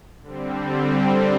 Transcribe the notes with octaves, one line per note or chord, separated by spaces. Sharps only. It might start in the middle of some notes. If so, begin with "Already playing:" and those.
D3 G3 C4